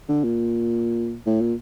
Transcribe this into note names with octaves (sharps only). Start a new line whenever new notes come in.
D3
A#2
A2
A#2